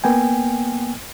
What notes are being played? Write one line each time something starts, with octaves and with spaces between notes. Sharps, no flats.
A#3 B3 G5 G#5